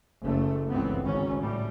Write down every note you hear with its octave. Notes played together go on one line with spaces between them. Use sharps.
F#1 A3
G1 C#2 E3 B3 C4
G#1 C#4
A2 G3